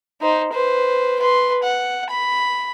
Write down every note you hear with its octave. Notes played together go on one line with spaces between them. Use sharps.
D#4 C5
B4 C5
B4 C6
F#5
B5